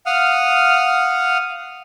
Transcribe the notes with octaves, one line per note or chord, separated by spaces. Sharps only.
F5 F#5 D#6 F6